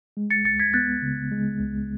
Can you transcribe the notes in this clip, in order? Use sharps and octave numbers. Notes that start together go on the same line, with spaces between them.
G#3
A6 C#7
C#2 A6 C#7
G#6 B6
B3 F#6 A6
C#3
G#3
C#2